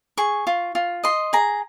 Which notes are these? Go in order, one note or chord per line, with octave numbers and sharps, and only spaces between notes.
G#4 C#6
F4
F4
D#5 C6
G#4 A#5